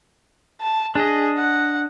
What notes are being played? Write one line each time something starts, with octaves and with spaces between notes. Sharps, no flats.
A5
D4 G#4 D#5
F#5